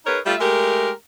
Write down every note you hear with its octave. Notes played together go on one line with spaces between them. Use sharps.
D#4 G#4 A#4 B4 C#5
G3 A3 F4 E5
G#3 A3 G4 A#4